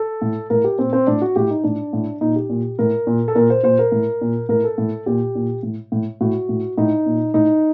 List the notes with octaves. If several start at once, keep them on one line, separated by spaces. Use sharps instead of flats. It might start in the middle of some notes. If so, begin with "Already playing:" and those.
Already playing: A4
A2
A2 A#4
G4
A#2 C4
C4
A2 D4
F#4
A2 G4
D#4
A2 D4
A2
A#2 D#4
G4
A#2
A2 A#4
A#2
A4
A#2 A#4
C5
A#2 C5
A#4
A2
A#2
A2 A#4
A4
A2
A#2 G4
A#2
A2
A2
A2 F#4
A2
A2 D#4
A#2
A2 D#4